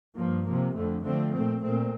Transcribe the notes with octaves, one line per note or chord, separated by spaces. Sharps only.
G2 F3 A#3
C3 F3 A#3
F2 D3 A3
D3 F3 A3 C4
A#2 A3 C4
A#2 A3 C4